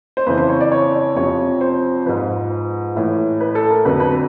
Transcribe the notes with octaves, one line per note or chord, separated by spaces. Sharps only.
C5
F2 C#3 E3 B4
C5
C#5
D5
C#5
F2 C3 F3 C#5
C5
G#2 F3 B4
A2 E3
B4
A4
A#4
F2 D3 F#3 B4
B4